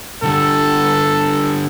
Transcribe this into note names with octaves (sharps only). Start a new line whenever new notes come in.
D3 G3 A4